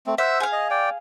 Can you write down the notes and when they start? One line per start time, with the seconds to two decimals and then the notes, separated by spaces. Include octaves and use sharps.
0.07 A3 C4
0.18 C5 E5 F#5
0.40 G#4 F5
0.52 D#5
0.70 D5 G5